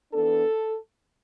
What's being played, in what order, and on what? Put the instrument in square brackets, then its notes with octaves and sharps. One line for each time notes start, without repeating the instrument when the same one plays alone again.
[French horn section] E3 B3 D4 A4